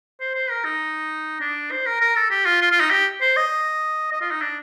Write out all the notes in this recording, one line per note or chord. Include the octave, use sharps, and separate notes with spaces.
C5
C5
A#4
D#4
D4
C5
A#4
A#4
A4
G4
F4
F4
F4
D#4
G4
C5
D#5
D#5
F4
D#4
D4